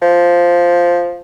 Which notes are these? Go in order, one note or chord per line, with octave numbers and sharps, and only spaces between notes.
F3